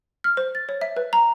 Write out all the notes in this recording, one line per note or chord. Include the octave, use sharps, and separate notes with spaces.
F6
C5
A6
C#5
E5
B4
A#5